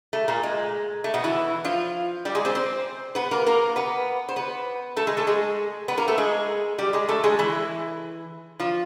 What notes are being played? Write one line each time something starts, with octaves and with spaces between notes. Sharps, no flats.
A3
A#2 A#3
G#3
A3
B2 B3
E3 E4
F3 F4
G3 G4
G#3 G#4
C4 C5
C4 C5
B3 B4
A#3 A#4
A#3 A#4
B3 B4
C5
B3 B4
A3 A4
G#3 G#4
A3 A4
G#3 G#4
B3 B4
A#3 A#4
A3 A4
G#3 G#4
G3 G4
G#3 G#4
A3 A4
G#3 G#4
E3 E4
F3 F4